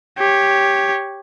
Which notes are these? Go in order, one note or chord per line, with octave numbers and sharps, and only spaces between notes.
G4 C#5